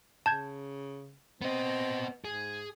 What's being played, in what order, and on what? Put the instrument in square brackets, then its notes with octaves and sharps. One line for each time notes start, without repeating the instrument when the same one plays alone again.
[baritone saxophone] C#3 [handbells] A5 G6 G#6
[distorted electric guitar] B3 D#5 [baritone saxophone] C4
[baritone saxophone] G#2 [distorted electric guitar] G#4